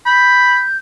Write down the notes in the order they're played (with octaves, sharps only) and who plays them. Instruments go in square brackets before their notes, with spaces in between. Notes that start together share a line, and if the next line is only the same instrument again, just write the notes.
[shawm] B5 [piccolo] G6